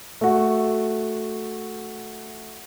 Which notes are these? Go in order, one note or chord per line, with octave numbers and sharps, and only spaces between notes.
A3 F#4